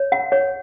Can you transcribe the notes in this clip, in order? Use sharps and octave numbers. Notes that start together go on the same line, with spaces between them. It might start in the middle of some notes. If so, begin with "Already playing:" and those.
Already playing: C#5
F#5
C#5